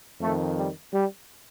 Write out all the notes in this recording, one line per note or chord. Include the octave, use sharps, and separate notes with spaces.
F2 D#3 A3
G3
G3